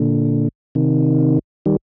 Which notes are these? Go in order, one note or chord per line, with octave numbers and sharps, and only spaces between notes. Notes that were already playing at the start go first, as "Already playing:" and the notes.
Already playing: A#2 D3
C3 D#3
D#3 G3